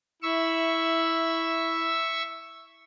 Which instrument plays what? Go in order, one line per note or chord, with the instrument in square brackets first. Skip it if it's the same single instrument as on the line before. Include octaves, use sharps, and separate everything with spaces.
[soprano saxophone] E4 [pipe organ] E5 C#6 E6